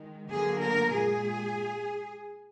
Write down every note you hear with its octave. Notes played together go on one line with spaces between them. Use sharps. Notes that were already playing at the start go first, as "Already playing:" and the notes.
Already playing: D#3 G#3
D3 F#3 A#3 G#4
A#4
A#2 G#3 G#4